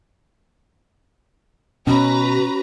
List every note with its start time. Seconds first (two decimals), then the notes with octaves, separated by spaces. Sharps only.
1.87 B2 C#4 F#4 B4 A#5